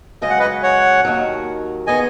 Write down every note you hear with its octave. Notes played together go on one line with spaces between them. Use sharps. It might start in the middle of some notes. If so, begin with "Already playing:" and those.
F#2 C#3 G#3 D#5
F#5
B4 D#5
C#5 F#5
D#2 D#3 F#3
D#3 B3 G#4 D#5 G#5